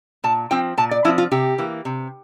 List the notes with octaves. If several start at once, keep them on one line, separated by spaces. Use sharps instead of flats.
A#2 A5
F3 C4 G5
A#2 A5
D5
F3 C4 E4
F4
C3 G4
E3 A#3
C3